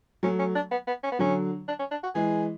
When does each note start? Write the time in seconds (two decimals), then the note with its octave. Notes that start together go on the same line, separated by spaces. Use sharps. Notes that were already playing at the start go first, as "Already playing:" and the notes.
0.23 F#3 A3 C#4
0.39 C#4
0.55 D4
0.71 B3
0.88 B3
1.04 C#4
1.12 B3
1.19 D3 F#3 C#4
1.68 D4
1.79 C#4
1.91 D4
2.04 F#4
2.15 E3 G#3 G#4